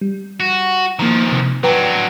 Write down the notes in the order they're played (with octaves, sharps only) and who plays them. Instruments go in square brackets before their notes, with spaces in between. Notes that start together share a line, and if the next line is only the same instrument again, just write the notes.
[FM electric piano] G3
[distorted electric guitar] F#4
[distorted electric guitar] D#3 F3 [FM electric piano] A#3 A#5
[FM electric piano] C3
[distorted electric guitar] F#3 D4 [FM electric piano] B4 G5 A#5